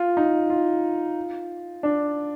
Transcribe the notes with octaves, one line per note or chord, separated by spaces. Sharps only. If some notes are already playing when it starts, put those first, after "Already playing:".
Already playing: F4
D#4
F4
D4